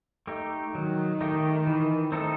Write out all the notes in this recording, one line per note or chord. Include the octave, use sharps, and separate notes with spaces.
A3 D#4 G4
D#3 F#3
A3 D#4 G4
E3
A3 C4 D#4 A4